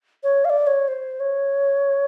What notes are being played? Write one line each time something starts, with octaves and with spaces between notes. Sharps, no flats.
C#5
F5
D5
C#5
C5
C#5